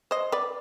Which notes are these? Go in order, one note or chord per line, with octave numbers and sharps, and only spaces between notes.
C5 D#5
B4 D5